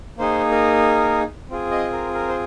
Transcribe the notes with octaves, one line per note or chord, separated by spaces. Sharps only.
A#3 D#4 G#4 C5
A#4
C4 F4 G#4
D#5
A#4
A#4
C5